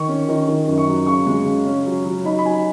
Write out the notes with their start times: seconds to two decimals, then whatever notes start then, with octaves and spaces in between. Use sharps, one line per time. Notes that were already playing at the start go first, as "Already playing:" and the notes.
Already playing: D#3 C#6
0.08 C#4
0.28 D#3
0.48 D#3
0.68 F#2
0.78 C#6
0.88 F#3
1.06 C#3 C#6
1.27 G#3
1.46 C#3
1.65 C#4
1.86 F#3
2.05 F#3
2.24 D#4 B5
2.39 B5
2.45 F#3 G#5